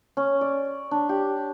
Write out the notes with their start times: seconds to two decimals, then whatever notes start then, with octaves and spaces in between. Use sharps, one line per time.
0.17 C#4
0.41 D5
0.91 D4
1.09 G4